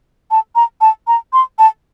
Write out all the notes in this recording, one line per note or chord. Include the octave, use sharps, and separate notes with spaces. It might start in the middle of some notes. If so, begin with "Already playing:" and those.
A5
A#5
A5
A#5
C6
A5